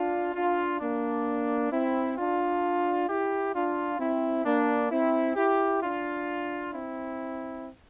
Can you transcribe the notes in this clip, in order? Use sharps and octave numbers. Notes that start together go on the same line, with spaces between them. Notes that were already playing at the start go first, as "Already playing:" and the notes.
Already playing: D4 F4
D4 F4
A#3 D4
C4 E4
D4 F4
E4 G4
D4 F4
C4 E4
A#3 D4
C4 E4
E4 G4
D4 F4
C4 E4